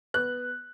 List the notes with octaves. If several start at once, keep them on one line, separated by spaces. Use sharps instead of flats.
B3 F#6